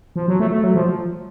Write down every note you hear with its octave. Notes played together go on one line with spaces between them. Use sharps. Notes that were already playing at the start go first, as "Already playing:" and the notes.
F3
F#3
A3
A3
F#3
F3